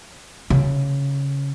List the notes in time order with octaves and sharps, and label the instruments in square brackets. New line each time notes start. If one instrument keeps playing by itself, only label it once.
[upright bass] C#3